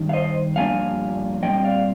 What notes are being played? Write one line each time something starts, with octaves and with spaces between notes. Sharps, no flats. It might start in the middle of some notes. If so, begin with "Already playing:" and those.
Already playing: G2 D#3
F5
C5 D#5
G2 D3 F3 A#3 D4 F5 G#5
A#2 G3 C4 D#5 G5
D5 F5